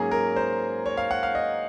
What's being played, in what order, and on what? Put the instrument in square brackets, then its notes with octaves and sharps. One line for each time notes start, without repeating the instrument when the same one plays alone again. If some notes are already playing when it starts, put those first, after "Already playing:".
Already playing: [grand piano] G#2 F#3 A#3 C#4 G#4
A#4
C5
C#5
F5
F#5
F5
D#5